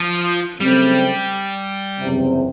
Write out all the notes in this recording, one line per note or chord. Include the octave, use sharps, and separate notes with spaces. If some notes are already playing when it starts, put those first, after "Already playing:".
Already playing: F3
C#3 F#3 G3 A3 C4
F#1 E2 C3